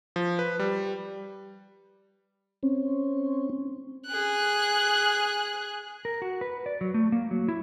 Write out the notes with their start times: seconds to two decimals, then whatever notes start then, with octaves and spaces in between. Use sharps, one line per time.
0.16 F3
0.39 B4
0.59 G3
2.63 C4 C#4
4.07 G#4 F#6
6.05 A#4
6.22 F#4
6.41 B4
6.66 D5
6.81 F#3
6.94 A3
7.12 A#3
7.31 F#3
7.48 E4